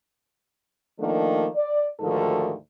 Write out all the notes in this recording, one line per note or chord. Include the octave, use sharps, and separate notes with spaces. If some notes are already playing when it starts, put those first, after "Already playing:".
D#3 F3 A3 A#3 D4
D5
D2 G#2 D#3 F3 A4